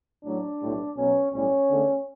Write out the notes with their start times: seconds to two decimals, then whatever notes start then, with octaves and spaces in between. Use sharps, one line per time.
0.24 A1 A2 F#3 A3 D4
0.60 B1 A2 G3
0.96 B1 B2 F#3 C#4
1.32 B1 A2 G3 C#4
1.68 E2 D3 A3